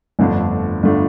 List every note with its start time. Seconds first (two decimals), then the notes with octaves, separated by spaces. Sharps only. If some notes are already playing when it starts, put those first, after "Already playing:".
0.19 G1 F2 D3 A3 D4
0.83 G1 D3 A3 D4